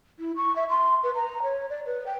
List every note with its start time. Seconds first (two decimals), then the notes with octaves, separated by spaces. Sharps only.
0.19 E4
0.36 C#6
0.56 E5
0.70 C6
1.03 B4
1.15 A#5
1.43 C#5
1.70 D5
1.86 B4
2.06 G5